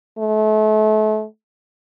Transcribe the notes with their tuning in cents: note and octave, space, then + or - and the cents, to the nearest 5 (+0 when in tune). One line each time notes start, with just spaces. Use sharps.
A3 -35